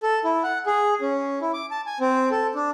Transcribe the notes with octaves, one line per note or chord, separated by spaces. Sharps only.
A4
E4
F#5
G#4
C#4
E4
D6
A5
G#5
C4
A4
D4